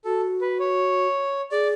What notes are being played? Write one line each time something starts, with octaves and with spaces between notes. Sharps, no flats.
F#4 A4
B4
C#5
G#4 D5